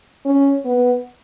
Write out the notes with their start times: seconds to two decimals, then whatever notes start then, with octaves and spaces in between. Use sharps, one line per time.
0.25 C#4
0.65 B3